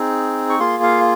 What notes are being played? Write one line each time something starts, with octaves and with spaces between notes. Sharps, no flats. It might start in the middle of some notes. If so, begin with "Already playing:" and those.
Already playing: C4 D#4 G#4
C#6
A#3 F4 G#4 C6
F5